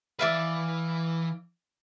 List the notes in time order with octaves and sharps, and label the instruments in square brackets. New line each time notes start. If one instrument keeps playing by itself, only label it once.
[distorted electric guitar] E3 B4 [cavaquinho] D5 E5 F5